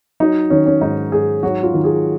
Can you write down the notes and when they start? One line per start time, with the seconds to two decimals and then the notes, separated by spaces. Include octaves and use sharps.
0.20 F#3 D#4
0.50 D#3 C#4
0.66 C#4
0.81 G#2 D#4
1.12 G#2 G#4
1.43 F#3 F#4
1.63 F4
1.74 D#3
1.84 G#4